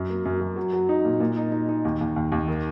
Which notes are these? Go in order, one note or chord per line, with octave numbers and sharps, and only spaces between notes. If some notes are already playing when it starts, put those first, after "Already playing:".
Already playing: F#2
A#3
F#2
F#2
F#3
F#3
D#4
A#2
A#2
D#4
D#4
D#4
D#2
D#2
D#2
D#2
D#3